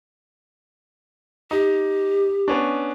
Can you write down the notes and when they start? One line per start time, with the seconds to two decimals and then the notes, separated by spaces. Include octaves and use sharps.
1.51 D#4 G4
2.48 B3 C#4 D4